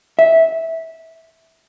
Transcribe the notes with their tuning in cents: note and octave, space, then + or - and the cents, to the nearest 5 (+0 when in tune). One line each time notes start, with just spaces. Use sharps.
E5 -15